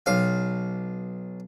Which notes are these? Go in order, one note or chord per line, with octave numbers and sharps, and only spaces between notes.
B1 F5